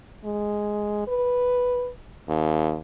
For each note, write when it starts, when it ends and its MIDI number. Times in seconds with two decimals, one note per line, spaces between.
0.25 1.03 56
1.08 1.90 71
2.29 2.78 39